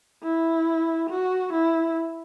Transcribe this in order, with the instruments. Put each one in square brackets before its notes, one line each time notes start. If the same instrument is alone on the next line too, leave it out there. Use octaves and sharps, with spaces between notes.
[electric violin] E4
F#4
E4